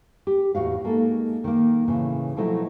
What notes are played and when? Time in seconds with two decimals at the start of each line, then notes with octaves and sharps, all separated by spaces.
0.27 G4
0.55 E2 A2 F#4 F5
0.84 G#3 A#3 D#4 A4
1.44 D#3 A#3
1.88 A2 C#3 E3
2.37 B2 F3 F#3 A3 E4 A#4